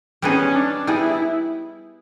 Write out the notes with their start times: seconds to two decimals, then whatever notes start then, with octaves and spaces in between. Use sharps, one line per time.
0.22 G3 B3 C#4 D#4 G#4
0.55 D4
0.87 G3 B3 D#4 E4 G#4